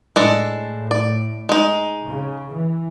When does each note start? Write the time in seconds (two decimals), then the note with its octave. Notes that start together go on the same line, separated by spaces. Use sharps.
0.16 A2 G#3 D4 A4
0.91 D5
1.49 G#3 D#4
2.06 C#3
2.53 E3